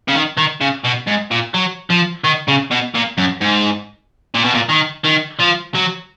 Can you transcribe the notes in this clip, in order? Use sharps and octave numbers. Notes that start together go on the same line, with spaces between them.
C#3
D#3
D#3
C#3
B2
G#2
A#2
F#3
F3
D#3
C#3
B2
A#2
F#2
G#2
A#2
B2
A#2
D#3
D#3
F3
F#3